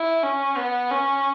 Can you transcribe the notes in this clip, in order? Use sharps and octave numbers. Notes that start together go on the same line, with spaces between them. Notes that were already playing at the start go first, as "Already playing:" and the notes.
Already playing: E4
C#4
B3
C#4